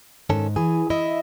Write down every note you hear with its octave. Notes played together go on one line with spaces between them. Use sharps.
G#2 D#3 C#4 A4
E3 G#4
E4 D#5 E5